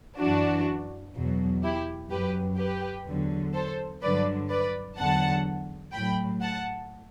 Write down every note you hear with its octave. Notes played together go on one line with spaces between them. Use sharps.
F#2 E3 D4 F#4
E2 B2 F#3
E4 G4
F#2 F#3 G4 B4
G4 B4
E2 D3 F#3
A4 C5
G2 D3 F#3 B4 D5
B4 D5
E2 D3 F#3 F#5 A5
A2 F#3 G5 B5
F#5 A5